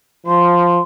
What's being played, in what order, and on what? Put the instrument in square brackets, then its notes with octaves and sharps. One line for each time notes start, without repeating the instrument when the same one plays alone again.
[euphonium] F3 [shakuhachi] C6